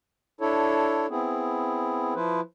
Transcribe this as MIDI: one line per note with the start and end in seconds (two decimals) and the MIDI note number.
0.41 1.06 62
0.41 1.06 64
0.41 1.06 69
0.41 1.06 73
1.10 2.14 59
1.10 2.14 60
1.10 2.14 64
1.10 2.14 68
2.15 2.41 53
2.15 2.41 64
2.15 2.41 71
2.15 2.41 72